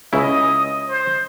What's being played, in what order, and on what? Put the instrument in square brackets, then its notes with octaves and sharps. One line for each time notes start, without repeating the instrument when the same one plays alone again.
[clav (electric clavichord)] C#2 C#3 E4 [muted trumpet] D#5
[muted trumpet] C5